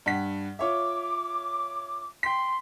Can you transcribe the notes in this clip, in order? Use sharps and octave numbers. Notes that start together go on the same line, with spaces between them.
G2 F#5 B6
F4 C#5 E5 D6
G5 C6 B6